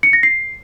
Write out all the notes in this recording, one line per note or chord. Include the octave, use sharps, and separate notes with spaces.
C#7
A#6
C7